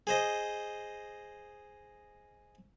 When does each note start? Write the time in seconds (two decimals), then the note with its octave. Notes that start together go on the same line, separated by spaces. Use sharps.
0.07 G#4 C5 D#5